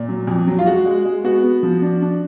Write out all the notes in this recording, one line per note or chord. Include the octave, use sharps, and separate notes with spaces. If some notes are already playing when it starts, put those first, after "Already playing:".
Already playing: A#2
F#3
F2
F#3
F4
G#3 F#4
G#3
G#3
B3 F#4
B3
F3
D4
D4